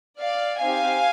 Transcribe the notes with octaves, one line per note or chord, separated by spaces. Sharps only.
D5 F5
C4 D#4 G4 F5 G#5